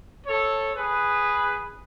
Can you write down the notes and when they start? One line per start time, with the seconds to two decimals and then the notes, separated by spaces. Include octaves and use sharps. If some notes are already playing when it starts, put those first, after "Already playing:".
0.27 A4 C#5
0.75 G#4 B4